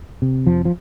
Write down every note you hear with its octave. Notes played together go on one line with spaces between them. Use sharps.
C3
F2 F3
F3